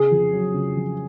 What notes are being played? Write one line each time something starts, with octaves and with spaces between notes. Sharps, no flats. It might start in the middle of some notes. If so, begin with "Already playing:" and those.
Already playing: C#3 G#4
F2
F#3
C#3
F2